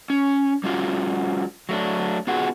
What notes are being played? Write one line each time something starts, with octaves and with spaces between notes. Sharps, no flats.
C#4
G3 C#4 F4 F#4
F#3 A3 D4
B3 F4 F#4 G#4